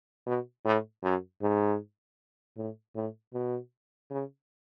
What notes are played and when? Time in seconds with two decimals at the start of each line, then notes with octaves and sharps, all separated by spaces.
0.26 B2
0.65 A2
1.03 F#2
1.42 G#2
2.57 A2
2.95 A2
3.34 B2
4.11 C#3